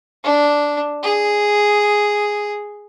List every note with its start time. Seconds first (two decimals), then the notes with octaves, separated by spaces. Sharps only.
0.24 D4
1.03 G#4